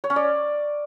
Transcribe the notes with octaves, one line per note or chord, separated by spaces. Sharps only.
C#5
C#4
D5